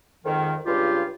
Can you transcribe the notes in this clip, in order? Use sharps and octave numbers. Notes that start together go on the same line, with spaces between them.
F2 G#2 D#3
C#2 G2 F4 G4